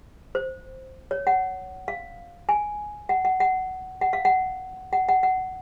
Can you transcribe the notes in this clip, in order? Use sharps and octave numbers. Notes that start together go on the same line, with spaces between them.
C5
C#5
F#5
F5
G#5
F#5
F#5
F#5
F#5
F5
F#5
F#5
F#5
F#5